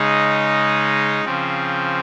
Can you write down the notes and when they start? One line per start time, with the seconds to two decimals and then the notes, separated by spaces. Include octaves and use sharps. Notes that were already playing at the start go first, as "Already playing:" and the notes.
Already playing: C#3 G#3 D#4
1.25 C#3 F3 C4